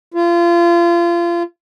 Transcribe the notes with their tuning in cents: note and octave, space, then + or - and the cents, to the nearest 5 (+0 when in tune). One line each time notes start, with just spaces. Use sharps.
F4 -30